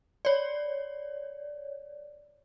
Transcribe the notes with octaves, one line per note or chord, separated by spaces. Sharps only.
C#5 D5